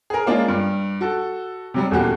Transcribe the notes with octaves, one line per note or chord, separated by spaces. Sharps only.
G#4 A#4
G#3 A#3 C#4 D4 F4
G2
F#4 A4
C3 F#3 G3
D#1 E2 A#3 F#4 G4